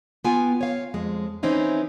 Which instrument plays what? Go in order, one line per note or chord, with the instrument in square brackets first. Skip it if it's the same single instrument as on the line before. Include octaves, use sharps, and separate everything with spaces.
[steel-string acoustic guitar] B3 F4 G5 G#5
C#5 F5
F2 G#3
E3 C4 C#4 D#4 E4